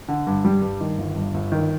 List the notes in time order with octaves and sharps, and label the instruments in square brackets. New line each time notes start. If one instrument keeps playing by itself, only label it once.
[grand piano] D3
G2
G3
G2
D#3
G1
G2
G1
D#3